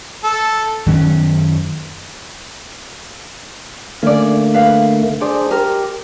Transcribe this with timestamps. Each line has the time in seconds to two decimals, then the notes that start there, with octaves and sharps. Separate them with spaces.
0.23 A4
0.86 F#2 D#3 F#3 C#4
4.03 D3 A3 A#3 C#4 D5
4.54 B4 F5
5.21 D4 G#4 C5 D5
5.51 G4 A#4